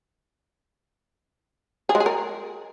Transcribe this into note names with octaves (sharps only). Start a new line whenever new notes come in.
G#4
G#3
G#4
A#4